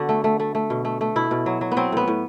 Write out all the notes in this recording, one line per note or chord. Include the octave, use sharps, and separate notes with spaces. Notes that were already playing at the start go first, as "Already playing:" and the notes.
Already playing: D3 B3 F#4
A3
A3
A3
A3
B2
A3
A3
B2 E4
B2
F#3
F#3
B3
F#3 C4
A2 B3
A2